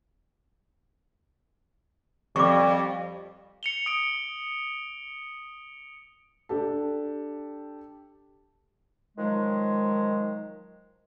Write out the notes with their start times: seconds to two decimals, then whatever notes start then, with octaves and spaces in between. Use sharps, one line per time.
2.36 F2 G3 C#6 D6
3.63 C#7 F7 G7
3.86 D#6 C#7 D7
6.49 D4 G4 A4
9.17 D#3 F3 F#3 G#3